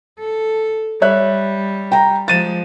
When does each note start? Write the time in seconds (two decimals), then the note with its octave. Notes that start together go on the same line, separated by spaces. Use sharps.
0.19 A4
1.02 G3 C#5 E5 F#6
1.92 G5 A#5
2.28 F3 G#3 A6 D#7 E7